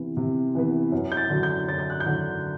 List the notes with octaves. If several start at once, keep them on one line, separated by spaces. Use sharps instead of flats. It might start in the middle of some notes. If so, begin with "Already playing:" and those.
Already playing: C3 E3 B3
C3
E3 B3
F#2
G6
A6
D3 F#3
G6
F#2 A6
G6
F#6
G6
D3 F#3